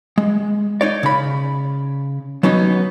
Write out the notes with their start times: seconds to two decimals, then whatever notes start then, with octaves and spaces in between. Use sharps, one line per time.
0.18 G#3
0.81 D#4 C#5 D5
1.03 C#3 B5
2.43 F#3 B3 C#4 D#4